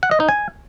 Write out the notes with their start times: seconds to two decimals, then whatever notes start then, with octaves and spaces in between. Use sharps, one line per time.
0.03 F#5
0.11 D#5
0.20 D#4
0.29 G#5